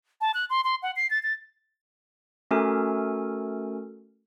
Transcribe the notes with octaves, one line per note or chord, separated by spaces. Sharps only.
A5
F#6
C6
C6
F#5
C7
A6
A6
A3 C#4 F#4 A4 A#4 G#5